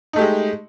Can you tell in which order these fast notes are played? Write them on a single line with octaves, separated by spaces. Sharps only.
D#4 A3 G4 G#3